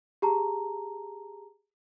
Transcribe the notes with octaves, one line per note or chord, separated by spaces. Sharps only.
G4 G#4 A5 A#5